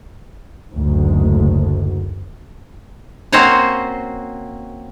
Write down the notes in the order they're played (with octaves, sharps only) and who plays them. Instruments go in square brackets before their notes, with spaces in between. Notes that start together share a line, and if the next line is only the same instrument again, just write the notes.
[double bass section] F#1 D2 G#2
[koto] A#3 C4 C#4 F#4 C5 C#5